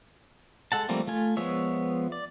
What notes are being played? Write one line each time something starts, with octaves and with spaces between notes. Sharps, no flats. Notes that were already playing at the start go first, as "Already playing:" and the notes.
G#3 A4 F#5 A5
F3 G3 A3 A#3 C4
A3 F4 G#5
F3 G#3 B3 C#5 E5
D5